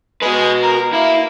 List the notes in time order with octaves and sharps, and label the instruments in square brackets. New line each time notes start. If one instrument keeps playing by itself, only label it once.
[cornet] G#3 [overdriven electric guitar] F#4 B4
[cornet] A#4
[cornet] A#3 [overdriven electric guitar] E4